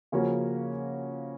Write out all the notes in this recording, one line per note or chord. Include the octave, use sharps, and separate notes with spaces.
C#3 F3 A#3 C#4 F#4